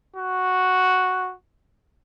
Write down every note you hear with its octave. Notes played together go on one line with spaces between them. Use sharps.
F#4